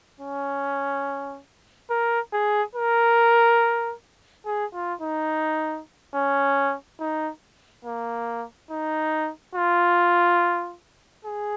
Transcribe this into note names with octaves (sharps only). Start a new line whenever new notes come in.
C#4
A#4
G#4
A#4
G#4
F4
D#4
C#4
D#4
A#3
D#4
F4
G#4